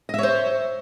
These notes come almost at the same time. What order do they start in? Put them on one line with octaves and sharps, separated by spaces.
D#5 E5 C#5 C5